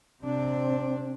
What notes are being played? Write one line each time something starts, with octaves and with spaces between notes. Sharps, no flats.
C3 C4 D4